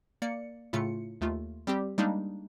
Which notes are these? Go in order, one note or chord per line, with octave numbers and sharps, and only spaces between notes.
A#3 D5 C#7
A2 C#3 A3 F4 C#7
D#2 A3 F4
G3 C4 G4
G3 G#3 A#3 D4 D#4